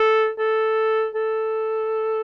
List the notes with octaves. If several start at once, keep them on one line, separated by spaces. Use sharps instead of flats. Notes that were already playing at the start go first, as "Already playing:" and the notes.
Already playing: A4
A4
A4